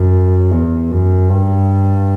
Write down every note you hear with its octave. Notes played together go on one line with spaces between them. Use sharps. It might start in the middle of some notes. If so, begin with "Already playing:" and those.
Already playing: F#2
E2
F#2
G2